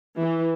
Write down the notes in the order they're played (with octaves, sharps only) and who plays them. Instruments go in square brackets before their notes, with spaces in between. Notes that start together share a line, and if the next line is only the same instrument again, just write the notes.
[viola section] E3